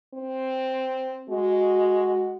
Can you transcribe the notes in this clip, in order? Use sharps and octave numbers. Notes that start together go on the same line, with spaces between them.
C4
G#3 F#4